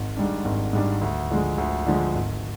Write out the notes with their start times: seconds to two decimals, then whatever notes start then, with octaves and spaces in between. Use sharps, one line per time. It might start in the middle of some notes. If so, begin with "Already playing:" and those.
Already playing: G#1
0.17 G#2 G3 D4
0.45 G#1
0.73 G#2 G3 D4
1.01 D2
1.30 D3 F3 G#3
1.58 D2
1.86 D3 F3 G#3
2.15 G#1